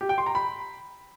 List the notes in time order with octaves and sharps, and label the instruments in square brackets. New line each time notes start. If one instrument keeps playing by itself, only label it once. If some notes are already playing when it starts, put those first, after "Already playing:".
[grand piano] G4
G5
C6
A#5
B5